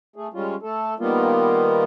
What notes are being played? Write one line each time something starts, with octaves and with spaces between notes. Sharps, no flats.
A3 G#4
G3 G#3 C#4 F4
A3 A4
D#3 G3 A#3 B3 F4